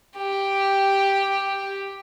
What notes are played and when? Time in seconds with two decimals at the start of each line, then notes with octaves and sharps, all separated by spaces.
0.17 G4